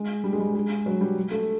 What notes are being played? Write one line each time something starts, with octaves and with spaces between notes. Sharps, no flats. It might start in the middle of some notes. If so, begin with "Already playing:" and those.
Already playing: G#3
G3
G#3
G3
G#3
F#3
G3
A3